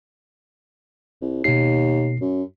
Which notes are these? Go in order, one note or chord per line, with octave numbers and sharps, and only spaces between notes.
C2
D#2 B2 C7
F#2